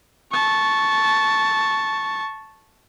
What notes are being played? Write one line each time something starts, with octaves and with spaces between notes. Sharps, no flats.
A5 C#6